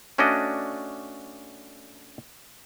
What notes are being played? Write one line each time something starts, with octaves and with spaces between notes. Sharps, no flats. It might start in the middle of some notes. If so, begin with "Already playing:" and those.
A3 C#4 D4 F#4 D5 D#5